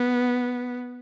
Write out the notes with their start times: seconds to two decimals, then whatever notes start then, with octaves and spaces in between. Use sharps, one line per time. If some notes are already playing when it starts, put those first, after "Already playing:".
Already playing: B3